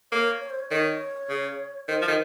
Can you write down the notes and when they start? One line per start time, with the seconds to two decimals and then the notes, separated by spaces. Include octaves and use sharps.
0.12 A#3 C#5
0.41 C#5
0.50 C5
0.59 C#5
0.71 D#3 C#5
1.29 C#3
1.88 D#3 C5
2.02 F3
2.08 D#3